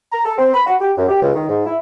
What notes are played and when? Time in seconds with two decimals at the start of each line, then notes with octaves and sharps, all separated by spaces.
0.13 A#5
0.25 A4
0.38 C4
0.54 B5
0.67 F#4
0.81 G4
0.98 F#2
1.09 G4
1.23 C#2
1.35 D#3
1.49 G#2
1.66 E4